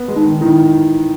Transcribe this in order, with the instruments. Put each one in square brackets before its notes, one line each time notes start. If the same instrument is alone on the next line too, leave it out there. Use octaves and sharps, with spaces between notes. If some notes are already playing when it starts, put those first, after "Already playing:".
Already playing: [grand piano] B3
G#3
[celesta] D#4
[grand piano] D#3
[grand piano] D#3 [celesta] E4